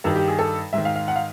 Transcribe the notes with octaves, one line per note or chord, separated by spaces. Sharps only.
G2 D#3 A4
G4
G#4
A4
G#2 D#3 E5
F5
F5
F#5
F5